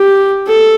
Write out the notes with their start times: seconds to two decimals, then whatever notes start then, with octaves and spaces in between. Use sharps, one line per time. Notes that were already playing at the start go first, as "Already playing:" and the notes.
Already playing: G4
0.47 A4